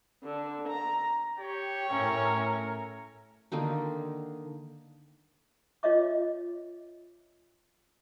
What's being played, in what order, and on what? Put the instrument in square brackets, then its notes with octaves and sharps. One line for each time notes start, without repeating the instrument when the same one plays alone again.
[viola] D3
A#5
[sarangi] G4 [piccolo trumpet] C#5
[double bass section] A2 [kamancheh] C#4 E5 [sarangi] A#4
[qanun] D3 D#3 A#3 D#4
[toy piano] F4 C#5 D#5 E5 D6